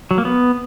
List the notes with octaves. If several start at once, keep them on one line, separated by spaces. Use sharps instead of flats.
F#3
A#3
B3